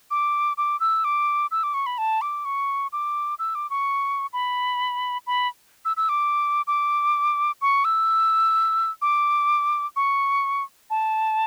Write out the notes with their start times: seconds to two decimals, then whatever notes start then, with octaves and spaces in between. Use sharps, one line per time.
0.11 D6
0.58 D6
0.80 E6
1.04 D6
1.51 E6
1.63 D6
1.74 C#6
1.86 B5
1.98 A5
2.21 D6
2.45 C#6
2.93 D6
3.39 E6
3.55 D6
3.70 C#6
4.33 B5
5.27 B5
5.85 E6
5.97 E6
6.09 D6
6.67 D6
7.62 C#6
7.85 E6
9.02 D6
9.96 C#6
10.90 A5